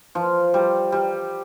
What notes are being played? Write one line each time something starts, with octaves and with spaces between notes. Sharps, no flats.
F3
G3
G3